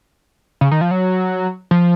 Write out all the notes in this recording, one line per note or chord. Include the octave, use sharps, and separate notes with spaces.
C#3
D#3
F3
F#3
F3